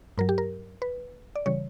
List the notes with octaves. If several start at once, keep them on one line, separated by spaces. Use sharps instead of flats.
G2 F#3 A#4
G4
A#4
B4
D5
C#3 E3 G3 C#5